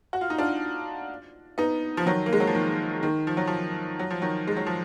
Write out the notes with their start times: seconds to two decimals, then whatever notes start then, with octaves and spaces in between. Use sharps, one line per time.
0.13 F#4
0.21 F4
0.30 D#4
0.38 D4 F4
1.58 B3 D#4
1.97 F3
2.06 D#3 F#3
2.26 A#3
2.33 G#3
2.40 F#3
2.47 F3
2.55 D#3
3.03 D#3
3.27 F3
3.37 F#3
3.47 F3
3.99 F#3
4.10 F3
4.22 D#3 F#3
4.47 G#3
4.57 F#3
4.66 F3